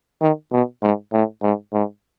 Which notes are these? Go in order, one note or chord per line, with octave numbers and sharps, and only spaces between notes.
D#3
B2
G#2
A2
G#2
G#2